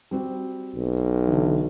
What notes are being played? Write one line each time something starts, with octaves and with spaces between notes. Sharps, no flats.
G3 C4 F#4
B1
D3 E3